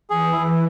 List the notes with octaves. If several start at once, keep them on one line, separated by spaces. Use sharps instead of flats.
E3 G#4
E4